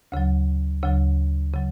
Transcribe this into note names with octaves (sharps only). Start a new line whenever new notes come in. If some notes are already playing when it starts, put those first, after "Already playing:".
D2 C#3 F#3
D2 C#3 F#3
C#3 F#3